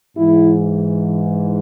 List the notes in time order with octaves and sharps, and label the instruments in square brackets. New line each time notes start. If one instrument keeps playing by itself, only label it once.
[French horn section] G#2 E3 E4